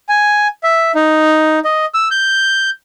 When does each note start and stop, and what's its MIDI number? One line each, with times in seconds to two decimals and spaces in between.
0.09 0.48 80
0.63 0.92 76
0.95 1.59 63
1.65 1.86 75
1.94 2.08 88
2.11 2.70 91